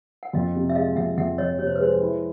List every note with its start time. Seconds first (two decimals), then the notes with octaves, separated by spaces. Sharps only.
0.23 F#5
0.33 F2 D#5 F5
0.55 C3
0.69 E5
0.75 G#3 D#5 F5
0.96 F2 E5 F#5
1.17 F2 E5 F#5
1.38 F3 C#5 D#5
1.58 C3 C#5
1.67 C5
1.76 B4
1.80 G#3 C5
2.00 E4